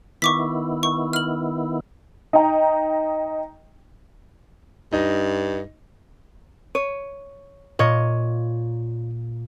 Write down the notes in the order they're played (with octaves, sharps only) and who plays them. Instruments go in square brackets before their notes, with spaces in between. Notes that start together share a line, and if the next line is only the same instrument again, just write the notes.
[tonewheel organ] D#3 B3 E4 [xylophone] C#6 D6 B6
[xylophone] C#6
F6 F#7
[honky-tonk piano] D#4 D#5 G5 A#5
[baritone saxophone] G2 [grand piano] D#4
[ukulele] C#5 [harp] D#7
[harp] A#2 [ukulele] F4 C#5 D#5